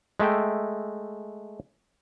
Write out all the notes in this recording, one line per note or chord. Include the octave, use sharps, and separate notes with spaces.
G#3 A3 E5 G5